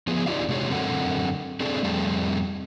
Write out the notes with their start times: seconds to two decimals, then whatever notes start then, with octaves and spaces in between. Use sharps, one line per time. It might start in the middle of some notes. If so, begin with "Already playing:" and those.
0.07 F3 B3 G#4
0.26 D4 D#4 F4 G4 D5 F5
0.48 C3 G#3 F#4 G#4 C#5
0.69 F#2 D3 C4 A4 A#4 F#5
1.60 C4 D4 G#4 A4
1.83 F2 G3 A3 C4 G#4 A5